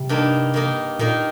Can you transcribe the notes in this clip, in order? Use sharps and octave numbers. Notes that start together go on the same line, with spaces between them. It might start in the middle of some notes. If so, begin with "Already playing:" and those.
Already playing: C3 G3
G2 D#3 A#3 D#4
D#3 A#3 D#4
A#2 D#3 A#3 D#4